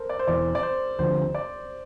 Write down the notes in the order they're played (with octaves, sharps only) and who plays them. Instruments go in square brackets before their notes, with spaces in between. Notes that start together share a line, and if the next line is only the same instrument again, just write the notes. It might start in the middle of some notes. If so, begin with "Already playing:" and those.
Already playing: [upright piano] A4 A#4 C5
D5
C5
[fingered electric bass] E1 E2 E3 [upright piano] D5
[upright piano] D5
C5
[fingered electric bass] D2 D3 F3 [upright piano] C5
[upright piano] D5